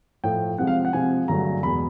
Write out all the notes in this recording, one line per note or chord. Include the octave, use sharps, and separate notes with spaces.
A2 F3 A3 G5
C3 F3 G#3 F#5
F5
F#5
C3 F3 G#3 G#5
G2 D3 F#3 A3 A#5
E2 B2 G#3 B3 B5